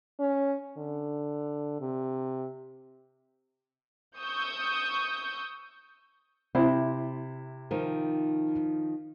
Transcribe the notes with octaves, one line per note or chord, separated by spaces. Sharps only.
C#4
D3
C3
C#6 D#6 E6 G6
C3 E4 C5
D#3 F3 D#4